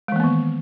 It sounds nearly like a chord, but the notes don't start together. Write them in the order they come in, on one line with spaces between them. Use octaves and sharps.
G#3 E3 A#3 B3 D#3